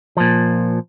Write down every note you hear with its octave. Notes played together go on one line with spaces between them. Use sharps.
A#2 F3